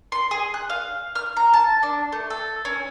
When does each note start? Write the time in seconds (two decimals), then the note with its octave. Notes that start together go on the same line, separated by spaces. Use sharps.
0.12 C6
0.31 G#4
0.54 F#6
0.70 F5
1.15 F6
1.37 A#5
1.53 A5
1.83 D4
2.12 A3
2.30 A4
2.65 C#4